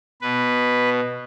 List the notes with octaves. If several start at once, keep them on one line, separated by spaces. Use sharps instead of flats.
B2 B4